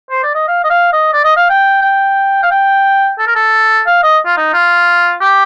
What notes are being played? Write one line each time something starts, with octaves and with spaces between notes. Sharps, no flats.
C5
D5
D#5
F5
D#5
F5
D#5
D5
D#5
F5
G5
G5
F5
G5
A4
A#4
A4
F5
D#5
F4
D#4
F4
G4